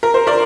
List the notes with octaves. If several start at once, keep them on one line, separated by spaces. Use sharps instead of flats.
A#4
C5
A#4 D5